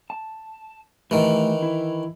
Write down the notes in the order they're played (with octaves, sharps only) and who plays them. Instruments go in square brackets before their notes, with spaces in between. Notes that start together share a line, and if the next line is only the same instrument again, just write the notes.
[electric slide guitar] A5
[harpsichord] D#3 E3 [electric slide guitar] A3 G4
[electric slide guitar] E4